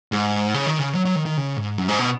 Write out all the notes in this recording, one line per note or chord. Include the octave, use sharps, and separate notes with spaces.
G#2
C#3
D#3
C#3
F#3
F#3
D#3
D#3
C#3
G#2
F#2
G#2
B2